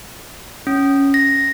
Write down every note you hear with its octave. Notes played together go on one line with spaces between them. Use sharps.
C#4
A#6